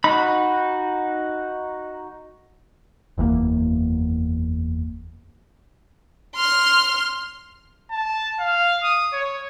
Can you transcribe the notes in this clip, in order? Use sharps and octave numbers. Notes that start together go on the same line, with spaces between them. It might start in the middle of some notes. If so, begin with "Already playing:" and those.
D#4 F#4 B5
F#1 E2 A2 A#3
C6 F6
A5
F5
D#6
C#5